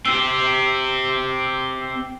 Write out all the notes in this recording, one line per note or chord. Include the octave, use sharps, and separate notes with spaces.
C4 G4 E6